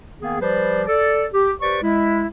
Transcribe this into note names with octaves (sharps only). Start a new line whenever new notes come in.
D#3 A#3 B3 G#4
F3 G3 G4 B4 C5 D5
A4 D5
G4
G4 B4 C5 D5 C#6
G#3 E4